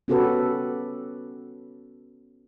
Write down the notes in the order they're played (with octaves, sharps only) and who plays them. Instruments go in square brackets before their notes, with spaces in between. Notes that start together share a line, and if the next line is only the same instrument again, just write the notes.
[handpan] B3 C#4 F#4 G4 A4 B4